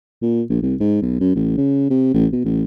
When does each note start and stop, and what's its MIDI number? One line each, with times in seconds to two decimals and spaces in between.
0.22 0.42 46
0.50 0.60 34
0.62 0.75 36
0.80 0.98 44
1.02 1.19 35
1.20 1.32 42
1.36 1.55 33
1.58 1.87 49
1.90 2.10 48
2.14 2.26 33
2.33 2.41 47
2.45 2.64 33